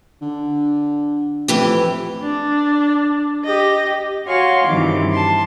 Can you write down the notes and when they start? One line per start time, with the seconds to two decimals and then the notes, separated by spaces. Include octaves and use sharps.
0.21 D3
1.48 F2 A2 E3 G4
2.23 D4
3.45 G4 D#5
4.26 F#4 C#5 F5 G#5 C6 C#6
4.66 G2 C3 D#3 E3 D6
5.12 A5 C6